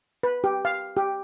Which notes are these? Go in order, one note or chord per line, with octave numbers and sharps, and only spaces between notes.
B4
G4
F5
G4